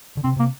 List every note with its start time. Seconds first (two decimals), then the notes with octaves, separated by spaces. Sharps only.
0.17 D3
0.24 C3 C4
0.36 C3 A#3